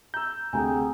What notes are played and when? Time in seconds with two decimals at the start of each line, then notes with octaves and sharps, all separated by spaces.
0.14 A#5 E6 G6
0.53 D2 C3 G#4 G5 G#5 A#5